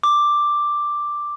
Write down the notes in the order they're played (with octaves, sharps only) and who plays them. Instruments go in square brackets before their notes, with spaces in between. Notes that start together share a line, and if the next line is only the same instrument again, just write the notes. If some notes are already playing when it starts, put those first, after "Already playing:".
[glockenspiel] D6